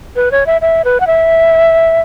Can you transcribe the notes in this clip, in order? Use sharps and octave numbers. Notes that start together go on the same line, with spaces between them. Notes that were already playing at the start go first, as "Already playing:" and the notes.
B4
C#5
E5
E5
B4
F#5
E5